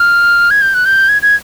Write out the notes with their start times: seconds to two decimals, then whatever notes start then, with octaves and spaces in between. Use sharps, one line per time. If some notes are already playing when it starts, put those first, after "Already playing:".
Already playing: F6
0.50 G#6
0.61 G6
0.74 F#6
0.85 G6
1.09 G#6
1.22 G#6